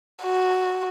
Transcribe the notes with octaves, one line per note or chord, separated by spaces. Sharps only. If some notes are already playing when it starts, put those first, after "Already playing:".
F#4